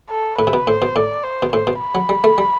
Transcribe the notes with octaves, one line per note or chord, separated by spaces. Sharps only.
A4
A2 B4
C3
B2
A2 C5
B2
A2 D5
C5
B2
A2 C5
B2
B5
F#3
G3
A3
G3